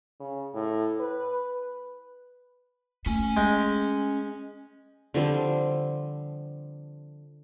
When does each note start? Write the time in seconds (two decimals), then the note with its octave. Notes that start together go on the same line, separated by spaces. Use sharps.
0.20 C#3
0.54 A2
1.00 B4
3.06 A3 C#4 G#5
3.37 G#3 G5
5.14 D3 F3 G3 C4